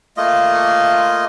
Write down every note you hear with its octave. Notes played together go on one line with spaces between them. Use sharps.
A3 A#3 F4 D#5